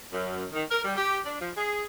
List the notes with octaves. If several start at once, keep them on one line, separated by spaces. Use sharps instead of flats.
F#2
D#3
A#4
G3
G4
D4
F3
G#4